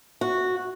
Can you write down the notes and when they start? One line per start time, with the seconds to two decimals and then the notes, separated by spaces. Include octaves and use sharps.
0.21 F#4